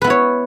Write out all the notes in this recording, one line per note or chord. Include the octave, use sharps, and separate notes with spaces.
B3 E4 B4 C#5